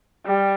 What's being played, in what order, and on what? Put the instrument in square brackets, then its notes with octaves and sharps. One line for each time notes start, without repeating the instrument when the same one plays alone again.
[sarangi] G3